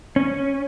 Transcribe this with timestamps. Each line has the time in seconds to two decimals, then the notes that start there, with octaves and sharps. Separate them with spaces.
0.16 C#4